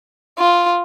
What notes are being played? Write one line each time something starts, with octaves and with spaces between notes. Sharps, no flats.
F4